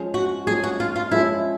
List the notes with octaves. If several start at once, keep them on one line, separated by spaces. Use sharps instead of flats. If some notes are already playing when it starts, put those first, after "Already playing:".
Already playing: F3 G#3 C#4
F#4
F3 G#3 C#4 G#4
F#4
F4
F4
F3 G#3 C#4 E4